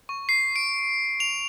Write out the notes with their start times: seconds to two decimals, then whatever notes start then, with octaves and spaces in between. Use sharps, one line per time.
0.09 C#6
0.29 C7
0.56 D7
1.20 F7